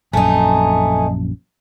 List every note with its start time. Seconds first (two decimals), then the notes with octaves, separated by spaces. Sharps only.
0.13 A#1 F#2 A3 D#4 G#5